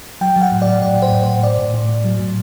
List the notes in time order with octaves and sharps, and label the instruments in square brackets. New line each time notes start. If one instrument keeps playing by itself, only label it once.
[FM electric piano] F#3 G5
F#3
F#5
A2
D5
F#3
A2 D5
A2 C5
A2
A2 C5
A2 D5
A2
A2
A2
F#3
A2